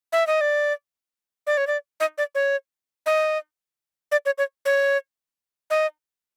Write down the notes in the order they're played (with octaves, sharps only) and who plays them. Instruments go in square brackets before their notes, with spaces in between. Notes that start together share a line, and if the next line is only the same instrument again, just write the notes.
[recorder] E5
D#5
D5
D5
C#5
D5
D#5
D5
C#5
D#5
D5
C#5
C#5
C#5
D#5